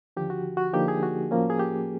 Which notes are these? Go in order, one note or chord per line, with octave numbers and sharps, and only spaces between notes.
D#2 D3 F3 G4
F#4
F#4
D3 F3 A#3 D#4 G4
G#4
F#4
A2 F3 A#3 C#4
G#4
G4